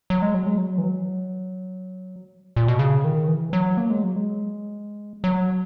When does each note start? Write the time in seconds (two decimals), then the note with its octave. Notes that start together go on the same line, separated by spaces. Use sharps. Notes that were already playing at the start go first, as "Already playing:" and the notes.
0.10 F#3
0.22 G#3
0.34 F#3
0.46 G#3
0.58 F#3
0.78 E3
0.84 F#3
2.56 A#2
2.68 B2
2.79 C#3
3.04 D#3
3.28 E3
3.53 F#3
3.77 A#3
3.90 G#3
4.04 F#3
4.16 G#3
5.24 F#3